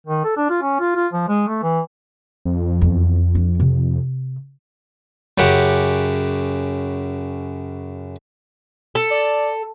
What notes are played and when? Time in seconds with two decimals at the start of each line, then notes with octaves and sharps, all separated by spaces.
0.07 D#3
0.24 A4
0.37 D4
0.50 F4
0.62 C#4
0.80 F4
0.96 F4
1.13 F3
1.28 G#3
1.48 A3
1.63 E3
2.45 F2
2.81 E2
3.35 D4
3.60 C3
5.38 F#2 C#3 G4 F#5 D6
8.95 A4
9.11 D5